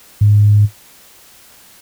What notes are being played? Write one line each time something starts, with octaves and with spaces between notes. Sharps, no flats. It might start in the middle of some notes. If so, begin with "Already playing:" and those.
G#2